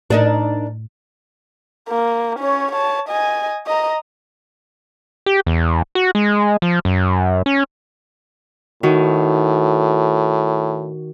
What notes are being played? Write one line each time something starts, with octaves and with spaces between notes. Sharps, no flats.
A2 D4 D#4 A#4
A#3
C#4 C#5
C#5 A5
D#5 G#5
D#5 A#5
G4
E2
F#4
G#3
F3
F#2
C#4
A2 D#3 D#4 F#4